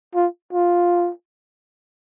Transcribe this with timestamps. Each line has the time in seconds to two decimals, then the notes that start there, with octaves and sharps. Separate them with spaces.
0.15 F4
0.53 F4